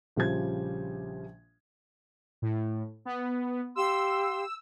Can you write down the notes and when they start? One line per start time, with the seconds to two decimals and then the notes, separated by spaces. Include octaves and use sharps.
0.16 A#1 C#3 F3 G3 C5 G#6
2.42 A2
3.05 B3
3.76 G4 F5 C6 E6